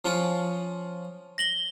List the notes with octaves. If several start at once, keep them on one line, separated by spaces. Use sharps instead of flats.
F3 C#4 F4
A#6 F#7 G7